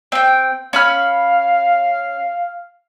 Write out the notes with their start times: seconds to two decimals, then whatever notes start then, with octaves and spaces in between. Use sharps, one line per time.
0.12 C4 G5
0.73 C#4 F5 B5 F6